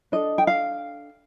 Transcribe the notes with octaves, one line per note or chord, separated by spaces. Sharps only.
D4 A4 D#5
G5
F5